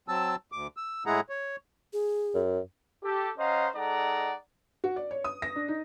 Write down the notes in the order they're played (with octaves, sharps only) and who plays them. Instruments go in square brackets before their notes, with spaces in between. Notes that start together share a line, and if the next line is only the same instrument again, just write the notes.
[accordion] F#3 C4 A5 E6
D2 D6
E6
A2 G#3 E4 G#4 F#5 A#5
C#5
[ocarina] G#4
[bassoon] F#2
[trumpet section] G4 A4
C#4 C5 D#5 F5 F#5 A#5
G#3 D#4 A4 D5 F#5 A#5
[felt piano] F#4
D5
C#5
D#6
A#6
D4
D#4